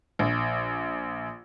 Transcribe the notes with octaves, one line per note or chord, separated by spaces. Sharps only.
A#1